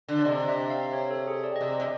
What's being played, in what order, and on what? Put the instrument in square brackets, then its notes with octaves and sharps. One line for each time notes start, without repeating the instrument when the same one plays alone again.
[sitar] D3
[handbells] D5
[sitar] C3 [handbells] D#5
[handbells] E5
F5
C#5
A4
G#4
D5
D#5
[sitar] C3 [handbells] D5
[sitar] C3